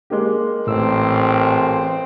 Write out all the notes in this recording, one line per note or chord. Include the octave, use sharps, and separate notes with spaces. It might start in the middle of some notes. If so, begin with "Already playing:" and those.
G#3 A#3 G4
A1 A2 C4 E6